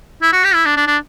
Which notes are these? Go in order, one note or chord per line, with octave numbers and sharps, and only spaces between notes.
E4
F#4
G4
E4
D4
D4
D4